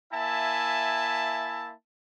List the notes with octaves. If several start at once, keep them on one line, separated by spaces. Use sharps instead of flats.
A#3 E4 E5 G#5 A5